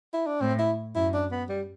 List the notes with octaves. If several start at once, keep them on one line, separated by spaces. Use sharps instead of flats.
E4
D4
A2 C4
E4
F#2 E4
D4
B3
G3